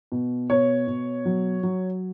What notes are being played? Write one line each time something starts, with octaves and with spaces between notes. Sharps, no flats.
B2
B2 C#5
B2
F#3
F#3